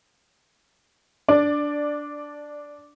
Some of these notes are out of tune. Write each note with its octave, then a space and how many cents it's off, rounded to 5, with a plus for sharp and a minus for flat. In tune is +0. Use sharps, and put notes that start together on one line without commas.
D4 -10 D5 +5